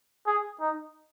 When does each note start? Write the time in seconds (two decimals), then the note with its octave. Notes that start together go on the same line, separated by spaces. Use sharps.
0.27 G#4
0.60 D#4